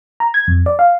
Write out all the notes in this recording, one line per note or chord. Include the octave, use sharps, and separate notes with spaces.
A#5
G#6
F2
D5
F5